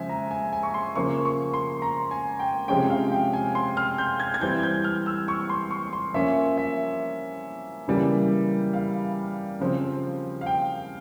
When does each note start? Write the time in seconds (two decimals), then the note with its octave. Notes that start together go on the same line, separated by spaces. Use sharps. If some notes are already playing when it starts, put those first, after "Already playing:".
Already playing: C#3 F3 G#3 E5 G#5
0.09 A#5
0.31 G#5
0.53 G#5
0.63 C#6
0.74 C6
0.95 C#3 F3 A#3 C#6
1.25 C#6
1.53 C6
1.82 A#5
2.11 G#5
2.39 G5
2.68 C3 F3 G#3 C#4 G5
2.90 F5
3.12 G5
3.33 G#5
3.55 C6
3.77 F6
3.98 G6
4.20 G#6
4.34 G#6
4.41 E3 G3 C4 G6
4.63 G6
4.84 F6
5.06 E6
5.28 C#6
5.49 C6
5.71 C#6
5.93 C6
6.14 F3 A#3 C#4 E5
6.58 E5
7.88 C#3 E3 G3 A#3
8.74 F5
9.60 C#3 F3 C4
10.41 F5
10.46 G5